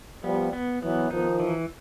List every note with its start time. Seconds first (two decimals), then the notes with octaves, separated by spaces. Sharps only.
0.23 F3 G3 B3
0.53 B3
0.82 E3 F#3 B3
1.11 D#3 F3 D#4
1.40 E3